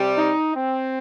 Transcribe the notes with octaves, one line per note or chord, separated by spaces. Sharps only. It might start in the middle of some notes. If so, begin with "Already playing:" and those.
Already playing: C3 G3
D#4
C4